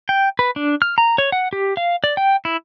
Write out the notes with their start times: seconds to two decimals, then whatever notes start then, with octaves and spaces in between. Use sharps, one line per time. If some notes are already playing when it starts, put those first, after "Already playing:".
0.09 G5
0.39 B4
0.56 D4
0.82 F6
0.98 A#5
1.18 C#5
1.32 F#5
1.53 G4
1.77 F5
2.04 D5
2.17 G5
2.45 E4